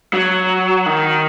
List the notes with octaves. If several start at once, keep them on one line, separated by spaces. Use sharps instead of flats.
F#3
D#3